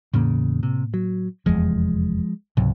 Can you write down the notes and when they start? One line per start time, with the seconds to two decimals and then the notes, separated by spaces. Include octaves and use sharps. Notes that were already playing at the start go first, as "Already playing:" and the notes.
0.14 E2 A2 C#3 A#3
0.63 C3
0.94 F#3
1.46 F1 E2 F3 G#3
2.57 C#2 G#2 C3 F#3